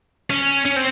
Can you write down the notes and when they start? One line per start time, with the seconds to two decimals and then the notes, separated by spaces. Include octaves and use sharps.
0.30 C#4
0.65 C#4
0.76 C4